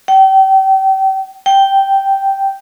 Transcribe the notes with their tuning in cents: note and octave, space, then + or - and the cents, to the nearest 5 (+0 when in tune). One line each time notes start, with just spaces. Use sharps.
G5 -35
G5 -5